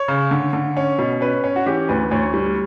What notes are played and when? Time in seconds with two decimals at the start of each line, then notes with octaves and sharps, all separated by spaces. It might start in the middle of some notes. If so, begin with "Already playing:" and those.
Already playing: C#5
0.08 C#3
0.31 D3
0.53 D3
0.77 C#4
0.98 B2
1.21 C#4 B4
1.44 C#4
1.56 F#4
1.66 E3 G4
1.89 D2 B4
2.11 D2 C#5
2.34 G3